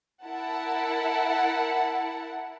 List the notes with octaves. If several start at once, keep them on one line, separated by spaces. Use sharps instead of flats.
E4 A#4 F#5 A5